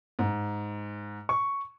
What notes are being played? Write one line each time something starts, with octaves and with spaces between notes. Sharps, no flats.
G#2
C#6